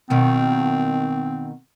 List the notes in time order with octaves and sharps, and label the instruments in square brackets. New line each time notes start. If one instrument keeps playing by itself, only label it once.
[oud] B2 D#3 [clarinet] C4